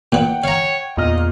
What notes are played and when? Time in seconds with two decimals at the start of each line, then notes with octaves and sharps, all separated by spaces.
0.12 A#2 B4 F#5 G5
0.44 C#5 F5 A#5
0.97 E2 A#2 D#5 F6